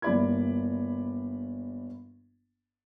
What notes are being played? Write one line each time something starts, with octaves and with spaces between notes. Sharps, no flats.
G1 A#3 E4 D5 B5 G#6